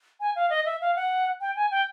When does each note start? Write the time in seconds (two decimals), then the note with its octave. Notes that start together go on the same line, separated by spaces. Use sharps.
0.20 G#5
0.36 F5
0.50 D#5
0.66 E5
0.81 F5
0.96 F#5
1.41 G5
1.56 G#5
1.71 G5